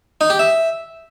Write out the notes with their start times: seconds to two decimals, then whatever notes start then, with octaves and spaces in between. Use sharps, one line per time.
0.21 D#4
0.30 G4
0.39 E5